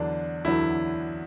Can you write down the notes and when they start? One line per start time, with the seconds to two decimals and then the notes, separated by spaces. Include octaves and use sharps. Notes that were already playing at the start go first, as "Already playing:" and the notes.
Already playing: E2 D3 F#3 D4
0.44 E2 D3 F#3 E4